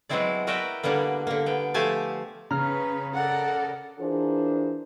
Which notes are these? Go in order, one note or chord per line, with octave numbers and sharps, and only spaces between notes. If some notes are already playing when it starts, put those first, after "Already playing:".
F#3 G#3 B3 C4 E4 D5
F#4 A#4 B4 D5 E5 G5
D3 G3 A#3 B3
D3 A#3
B3 G5
F3 A3 G4 G#5 A5
C#3 C#4 B4 A#5 F6
A4 A#4 D5 F#5
E3 D4 F4 G#4 A#4 C5